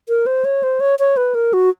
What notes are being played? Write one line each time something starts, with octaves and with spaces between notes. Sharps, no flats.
A#4
C5
C#5
C5
C#5
C#5
B4
A#4
F#4